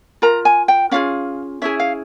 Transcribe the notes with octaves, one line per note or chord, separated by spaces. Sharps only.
F4 A#4 A#5
G#5
G5
C#4 F4 G#4 F5
C#4 E4 G#4 E5
F5